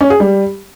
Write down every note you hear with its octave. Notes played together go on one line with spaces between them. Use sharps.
C#4
G#4
G3